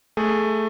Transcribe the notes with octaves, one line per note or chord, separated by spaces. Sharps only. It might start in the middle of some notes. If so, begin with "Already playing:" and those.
A3 G#4